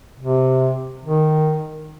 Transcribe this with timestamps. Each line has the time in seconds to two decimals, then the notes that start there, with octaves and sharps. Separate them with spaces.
0.19 C3
1.05 D#3